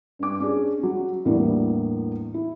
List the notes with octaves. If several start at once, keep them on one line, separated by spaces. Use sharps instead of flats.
G2 D6
C#4 D4 G#4
F#3 C#4
E2 A2 G3 A#3 B3 D4
E4